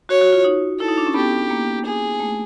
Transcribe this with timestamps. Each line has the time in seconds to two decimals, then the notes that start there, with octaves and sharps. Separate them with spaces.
0.09 F#4 C#5
0.21 F#4
0.33 F4
0.44 D#4
0.79 E4 A4
0.88 D#4
0.98 D4
1.07 C#4
1.15 B3 G4
1.50 A#3
1.85 G#4
2.20 A3